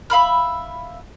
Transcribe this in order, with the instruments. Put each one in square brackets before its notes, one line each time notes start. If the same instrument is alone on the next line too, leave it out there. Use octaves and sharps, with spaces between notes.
[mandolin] E5 F5 B5 F6